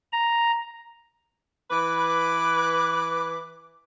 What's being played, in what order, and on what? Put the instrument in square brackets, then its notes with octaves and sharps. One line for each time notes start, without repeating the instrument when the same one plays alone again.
[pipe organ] A#5
[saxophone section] E3 E4 B4 [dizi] D6